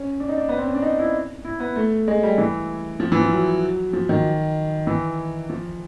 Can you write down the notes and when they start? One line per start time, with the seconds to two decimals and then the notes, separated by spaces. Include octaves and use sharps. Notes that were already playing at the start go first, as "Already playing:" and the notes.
Already playing: C#4
0.20 D4
0.29 D#4
0.37 D4
0.49 B3
0.58 C4
0.66 C#4
0.75 D4
0.82 D#4
0.99 E4
1.45 E4
1.60 B3
1.76 A3
2.08 G#3
2.23 G3
2.38 E3
3.00 F3
3.12 E3
3.21 F3
3.32 F#3
3.93 F3
4.09 D#3
4.87 E3
5.50 F3